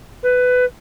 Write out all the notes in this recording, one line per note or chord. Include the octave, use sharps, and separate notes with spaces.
B4